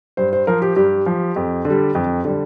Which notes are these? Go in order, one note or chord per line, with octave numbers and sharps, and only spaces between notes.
G2 C5
C5
F3 A#4
G4
G2 G4
F3
F2
D3
G3
F2
D3 G3